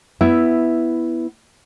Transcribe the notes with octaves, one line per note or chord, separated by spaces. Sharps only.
B3 E4 E5